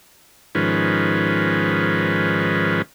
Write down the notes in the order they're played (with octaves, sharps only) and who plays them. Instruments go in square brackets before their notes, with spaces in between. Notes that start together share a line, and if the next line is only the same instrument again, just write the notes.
[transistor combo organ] G#2 D#3 F3 C#4 B4